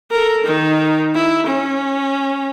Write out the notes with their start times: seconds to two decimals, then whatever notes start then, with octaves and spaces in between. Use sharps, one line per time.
0.11 A4 A#4
0.44 D#3 D#4
1.14 E4
1.47 C#4